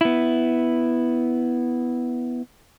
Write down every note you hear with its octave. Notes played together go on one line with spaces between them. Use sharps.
B3 E4